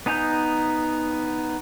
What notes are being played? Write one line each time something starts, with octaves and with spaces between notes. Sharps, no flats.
B3 D#4 G#5 A#5 G6